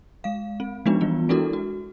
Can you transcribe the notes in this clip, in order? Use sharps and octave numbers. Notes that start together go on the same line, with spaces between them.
G#3 F5
C4
F3 G#3 B3 D4 D#4 F#4
E3 G3 B3 F4
G#3 D4 E4 F#4 A4 A#4
F#4